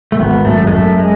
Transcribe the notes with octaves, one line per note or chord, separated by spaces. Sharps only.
A3
G#1 B3
F#2 A3
G#3
F#2 A3
G#3